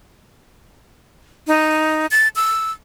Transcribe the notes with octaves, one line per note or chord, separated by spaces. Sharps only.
D#4
A6
E6